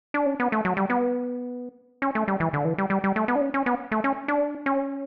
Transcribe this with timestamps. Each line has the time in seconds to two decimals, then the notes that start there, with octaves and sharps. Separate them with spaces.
0.14 D4
0.26 C#4
0.40 B3
0.52 A3
0.65 F#3
0.77 G3
0.90 B3
2.02 C#4
2.15 A3
2.28 G3
2.40 E3
2.53 D3
2.65 E3
2.78 G3
2.90 G3
3.04 G3
3.16 A3
3.28 B3
3.35 D4
3.41 C#4
3.54 C#4
3.66 B3
3.92 A3
4.04 C#4
4.28 D4
4.66 C#4